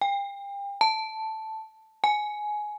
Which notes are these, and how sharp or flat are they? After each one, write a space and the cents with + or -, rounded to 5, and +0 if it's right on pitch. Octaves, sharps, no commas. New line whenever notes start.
G5 +35
A5 +0
G#5 +15